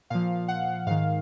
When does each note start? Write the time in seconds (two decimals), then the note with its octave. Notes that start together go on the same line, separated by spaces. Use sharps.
0.10 A#2 F3 F5
0.48 F#5
0.87 G#2 D#3 F5